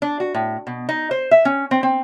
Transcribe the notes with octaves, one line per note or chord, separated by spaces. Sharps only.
D4
F#4
A2
B2
D#4
C5
E5
C#4
C4
C4